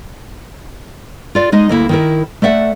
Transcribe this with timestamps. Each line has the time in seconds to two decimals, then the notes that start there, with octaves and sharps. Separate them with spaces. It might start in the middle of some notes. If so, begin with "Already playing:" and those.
1.35 F4 D5
1.52 G#3 D#4 D#5
1.69 D2 A#3 E4
1.89 D#3 E4 A#4
2.42 A3 D5 E5 F#5